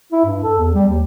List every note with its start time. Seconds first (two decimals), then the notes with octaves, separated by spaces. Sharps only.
0.12 E4
0.25 G2
0.43 A4
0.58 E2
0.74 G3
0.89 D#2